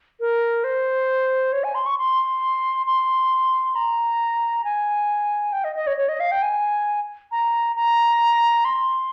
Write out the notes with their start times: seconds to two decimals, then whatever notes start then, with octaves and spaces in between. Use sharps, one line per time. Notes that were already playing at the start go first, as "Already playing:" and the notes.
0.20 A#4
0.64 C5
1.52 C#5
1.64 G#5
1.75 C6
1.86 C#6
1.98 C6
2.86 C6
3.76 A#5
4.64 G#5
5.53 G5
5.64 D#5
5.76 D#5
5.87 C#5
5.97 C#5
6.09 D#5
6.20 F5
6.32 G5
6.42 G#5
7.32 A#5
7.76 A#5
8.65 C6